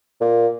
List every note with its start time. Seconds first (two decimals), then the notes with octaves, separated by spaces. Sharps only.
0.20 A#2